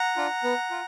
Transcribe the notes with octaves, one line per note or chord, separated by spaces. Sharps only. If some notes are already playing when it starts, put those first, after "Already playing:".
Already playing: F#5 A#5
D4 F4
B3
F4